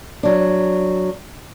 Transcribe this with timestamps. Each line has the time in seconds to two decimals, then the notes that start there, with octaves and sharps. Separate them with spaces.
0.23 F#3 D4